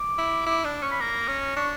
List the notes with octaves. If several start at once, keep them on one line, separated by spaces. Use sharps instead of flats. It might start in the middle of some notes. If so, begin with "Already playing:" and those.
Already playing: D6
E4
E4
D4
C#4 C#6
B5
A#3 A#5
C#4
D4 C#6